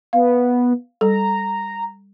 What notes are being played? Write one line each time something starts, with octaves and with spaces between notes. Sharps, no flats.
B3 F5
G3 A4 A#5